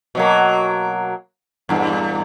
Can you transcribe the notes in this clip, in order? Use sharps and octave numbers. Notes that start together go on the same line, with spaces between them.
B2 F#3 A#3
E2 G2 A#2